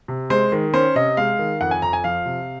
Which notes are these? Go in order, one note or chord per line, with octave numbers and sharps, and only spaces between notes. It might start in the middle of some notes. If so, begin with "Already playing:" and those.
C3
G#3 C5
D#3
C#4 C5
C3 D#5
G#3 F5
D#3
F2 F#5
G#5
F2 A#5
G#5
F3 F5
C3